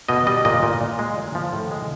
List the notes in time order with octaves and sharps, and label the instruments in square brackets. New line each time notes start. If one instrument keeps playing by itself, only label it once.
[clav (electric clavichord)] B2 D#5
G3 D#5
A#2 D#5
A#2
A#2
G#3
A#2
F3
A2
G#3